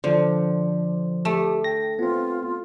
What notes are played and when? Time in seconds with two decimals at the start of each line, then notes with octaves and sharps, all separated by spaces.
0.04 D3 F3 C5
1.25 A3 G4
1.64 G5 A#6
1.99 B3 C4 F4